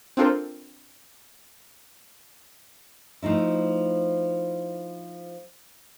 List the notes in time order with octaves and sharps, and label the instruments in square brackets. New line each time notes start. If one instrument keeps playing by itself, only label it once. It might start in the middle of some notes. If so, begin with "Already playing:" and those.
[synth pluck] C4 D4 F4 A4 A#4 C5
[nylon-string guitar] F3 A3 D#4 E4